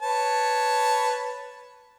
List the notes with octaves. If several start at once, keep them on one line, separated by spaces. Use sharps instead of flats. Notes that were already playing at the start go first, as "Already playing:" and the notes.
B4 C#5 A5